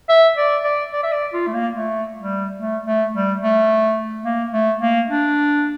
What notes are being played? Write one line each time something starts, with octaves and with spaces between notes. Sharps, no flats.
E5
D5
D5
D5
E5
D5
F4
A3
A#3
A3
G3
A3
A3
G3
A3
A#3
A3
A#3
D4